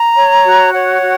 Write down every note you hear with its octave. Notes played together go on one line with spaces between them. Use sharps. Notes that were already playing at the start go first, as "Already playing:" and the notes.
Already playing: A#5
C#5
F#4
C#5 F#5
F#4